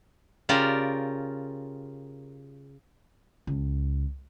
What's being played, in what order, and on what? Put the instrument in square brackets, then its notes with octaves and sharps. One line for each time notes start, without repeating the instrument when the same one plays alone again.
[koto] C#3 F4 G4 A#4 D5
[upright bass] C#2